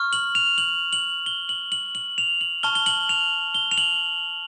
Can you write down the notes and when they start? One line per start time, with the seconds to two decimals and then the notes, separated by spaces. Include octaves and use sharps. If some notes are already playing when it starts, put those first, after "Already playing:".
Already playing: C#6 F6
0.13 F#7
0.35 F7
0.58 F#7
0.93 F#7
1.26 G7
1.49 F#7
1.72 F#7
1.95 F#7
2.18 F7
2.41 F#7
2.63 A5 C#6 F6 G7
2.75 G7
2.86 F#7
3.09 F7
3.54 G7
3.71 F7
3.78 F#7